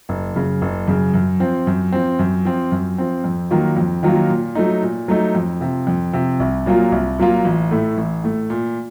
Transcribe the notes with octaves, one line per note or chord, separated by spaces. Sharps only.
F#1
F#2 C#3
F#1
F#2 C#3
F#2
F3 C4
F#2
F3 C4
F#2
F3 C4
F#2
F3 C4
F2
D#3 F#3 A#3 F4
F2
D#3 F#3 A#3 F4
A#2
F#3 A3 D#4
A#2
F#3 A3 D#4
F2
C3 F3
F2
C3 F3
C2
A#2 F#3 A#3 F4
C2
A#2 F#3 A#3 F4
A1
A2 A3
A1
A2 A3
A#2